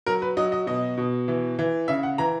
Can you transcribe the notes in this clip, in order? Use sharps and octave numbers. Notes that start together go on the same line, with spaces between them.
F#3 A#4
B4
F#3 D#5
D#5
B2 D#5
B2
E3
E3
C#3 E5
F#5
E3 A#5